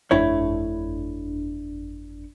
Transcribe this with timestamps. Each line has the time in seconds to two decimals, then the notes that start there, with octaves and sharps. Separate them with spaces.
0.11 G1 F2 A3 D4 E4 C#5